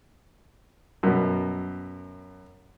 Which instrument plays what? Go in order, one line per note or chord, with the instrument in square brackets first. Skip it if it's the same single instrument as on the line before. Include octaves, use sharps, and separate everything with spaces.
[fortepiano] F#2 B2